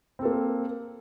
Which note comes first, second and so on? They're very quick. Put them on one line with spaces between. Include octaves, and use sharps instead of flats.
C4 A4 A#3